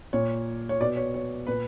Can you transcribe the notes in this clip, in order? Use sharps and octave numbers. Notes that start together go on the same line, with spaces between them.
A#2 C#5
C#5
B2 D5
C#5
C#5
A#2 B4